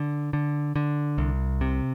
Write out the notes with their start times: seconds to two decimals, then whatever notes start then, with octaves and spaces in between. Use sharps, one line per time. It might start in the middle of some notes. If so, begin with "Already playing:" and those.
Already playing: D3
0.33 D3
0.76 D3
1.18 C2
1.61 C3